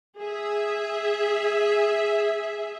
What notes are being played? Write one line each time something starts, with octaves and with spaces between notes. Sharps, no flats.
G#4 E5